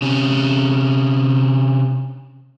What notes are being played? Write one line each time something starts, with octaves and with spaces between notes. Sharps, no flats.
C3 C#4